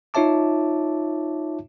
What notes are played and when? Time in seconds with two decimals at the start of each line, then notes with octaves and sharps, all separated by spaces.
0.14 D#4 F4 C#5 E5 A5 D6